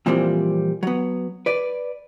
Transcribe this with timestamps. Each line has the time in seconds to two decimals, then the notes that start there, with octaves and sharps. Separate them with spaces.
0.06 A#2 E3 F3 G3 A#3 C4
0.83 F#3 B3
1.46 B4 D5